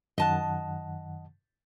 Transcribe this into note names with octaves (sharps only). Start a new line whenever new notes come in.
F#2 D#3 D#5 F#5 A5